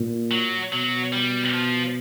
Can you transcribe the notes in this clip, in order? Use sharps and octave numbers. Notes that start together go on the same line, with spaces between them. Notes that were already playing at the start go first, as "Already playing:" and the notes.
Already playing: A#2
F#3
B2 F#3
G3
F3